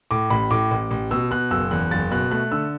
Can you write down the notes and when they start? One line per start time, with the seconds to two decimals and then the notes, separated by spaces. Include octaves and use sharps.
0.11 A2 D6
0.30 A1 B5
0.51 A2 D6
0.71 A1
0.91 A1
1.11 B2 E6
1.31 B2 F#6
1.51 F#1 E6
1.71 E2 F#6
1.91 F#1 A6
2.11 B2 F#6
2.31 A3 F#6
2.52 D3 E6